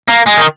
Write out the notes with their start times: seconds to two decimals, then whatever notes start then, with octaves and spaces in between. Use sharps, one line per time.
0.09 A#3
0.27 G#3
0.37 D#3